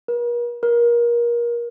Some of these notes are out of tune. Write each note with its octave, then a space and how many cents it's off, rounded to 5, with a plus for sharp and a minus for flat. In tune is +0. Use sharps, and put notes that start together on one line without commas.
A#4 +45
A#4 +30